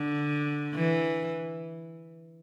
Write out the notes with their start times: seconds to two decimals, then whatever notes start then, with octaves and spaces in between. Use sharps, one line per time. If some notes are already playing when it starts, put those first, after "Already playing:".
Already playing: D3
0.74 E3